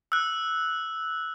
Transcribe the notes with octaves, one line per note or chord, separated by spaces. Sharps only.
E6 F#6